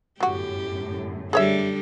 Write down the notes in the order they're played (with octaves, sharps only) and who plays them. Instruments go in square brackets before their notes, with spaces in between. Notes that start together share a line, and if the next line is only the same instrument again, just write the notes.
[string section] G1 F#2 A2 [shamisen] F#3 F#4 [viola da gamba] G4
[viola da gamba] D3 G3 [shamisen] G#4 C#5 E5